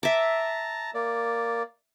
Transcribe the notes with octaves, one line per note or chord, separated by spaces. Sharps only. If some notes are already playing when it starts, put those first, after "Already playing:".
E5 A5 A#5 D6
A#3 D5